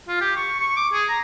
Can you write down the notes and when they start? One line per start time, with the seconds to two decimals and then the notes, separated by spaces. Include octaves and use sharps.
0.08 F4
0.21 G4
0.36 C#6
0.59 C#6
0.77 D6
0.93 G#4
1.09 A#5